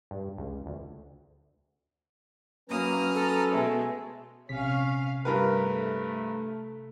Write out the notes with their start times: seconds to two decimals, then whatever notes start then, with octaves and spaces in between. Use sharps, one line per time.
0.11 G2
0.38 C#2
0.66 D2
2.70 F#3 A#3 C#4 B4 A#5 D#6 F6
3.15 A4
3.50 B2 G#3 A3
4.49 A#1 C3 C#4 F5 B6
5.25 G2 A3 A#4 B4